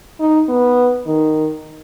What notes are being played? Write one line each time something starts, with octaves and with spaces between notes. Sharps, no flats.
D#4
B3
D#3